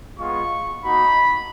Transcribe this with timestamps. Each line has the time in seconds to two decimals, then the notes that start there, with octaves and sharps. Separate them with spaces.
0.19 G#3 B3 F4 C#6
0.83 A#3 D#4 F#4 B5